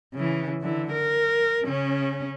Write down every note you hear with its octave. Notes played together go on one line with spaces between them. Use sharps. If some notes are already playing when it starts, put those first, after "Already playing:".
C#3 E3
D3 E3
A#4
C#3 C#4